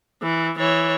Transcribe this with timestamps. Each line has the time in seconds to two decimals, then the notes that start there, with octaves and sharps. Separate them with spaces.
0.23 E3
0.58 E3 C#5